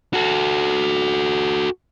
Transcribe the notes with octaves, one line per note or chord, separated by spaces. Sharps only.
F#4 A4